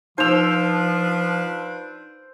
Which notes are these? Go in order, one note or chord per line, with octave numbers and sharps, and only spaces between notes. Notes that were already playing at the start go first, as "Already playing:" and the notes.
F3 D4 D#4 F4 B4 C5 E6 F7